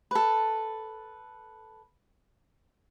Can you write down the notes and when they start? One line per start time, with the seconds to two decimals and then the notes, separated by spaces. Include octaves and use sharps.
0.11 A4 B4